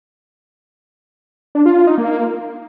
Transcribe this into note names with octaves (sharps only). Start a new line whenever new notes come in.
D4
F4
F4
D#4
A#3